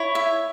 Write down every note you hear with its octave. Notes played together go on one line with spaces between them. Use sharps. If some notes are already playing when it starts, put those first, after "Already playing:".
Already playing: E4 C#5
E5